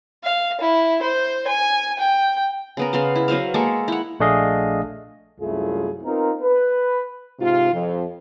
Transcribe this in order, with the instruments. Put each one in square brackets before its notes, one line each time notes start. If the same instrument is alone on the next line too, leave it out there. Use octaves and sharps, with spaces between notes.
[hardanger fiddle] F5
E4
C5
G#5
G5
[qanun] C#3 B3 A#4
C#3 B3 F5 C6
E4
F#3 B3 C5 F5
G#3 A#3 A4 C#6
E4 F#5
[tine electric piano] A#1 A3 D4 G#4 D#5 F5
[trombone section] C2 F#2 A3 E4 F4 G#4
B3 C4 D#4 F4 A#4
B4
[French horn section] G#2 C3 F4
F2